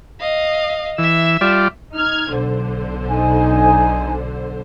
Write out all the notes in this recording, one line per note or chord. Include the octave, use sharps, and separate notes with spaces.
D#5 F5
E3 E5 E6
G3 F4 D5
D#4 F6 G#6
B1 D3 C5
D#4 G#5